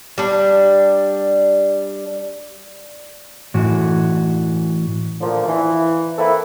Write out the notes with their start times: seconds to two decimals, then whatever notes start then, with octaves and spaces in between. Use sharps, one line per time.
0.18 G3 D4
3.54 A2 E3 F#4
5.21 A#2 D3 F3
5.48 E3
6.19 A#3 C4 E4 A4 B4